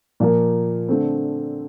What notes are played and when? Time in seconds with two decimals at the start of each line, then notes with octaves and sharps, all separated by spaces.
0.20 A#2 F3 A#3
0.88 D3 A3 C4